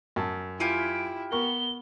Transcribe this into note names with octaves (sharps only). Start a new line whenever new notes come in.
F#2 A5
E4 F4 G4 G#5 D7
B3 A#4 C#6 G7